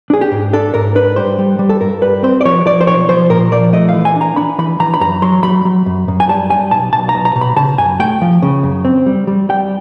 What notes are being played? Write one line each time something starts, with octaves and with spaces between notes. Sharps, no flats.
D4 G#4
G4
G#2
D4 A4
G#2 A#4
D4 B4
G3 C5
G3
G3
A4
G2 A#4
G3 B4
C4 C5
D5
F3 C#5
F3 D5
C5
B1 C#5
F3 C5
A#2 A#4
F3 D5
A3 D#5
E3 F5
G#5
D4
A#5
D4 B5
E3 B5
E3 A#5
B5
F#2 A#5
F#3 C6
F#3 B5
F#3
F#2
F#2
G#5
G3 A5
G3 G#5
B1 A5
B1 A5
A#5
B1
A#5
B2
B5
C#3 A5
F#2 G#5
A3 G5
F3
C#3
F#2
C4
G3
G3
G3 G5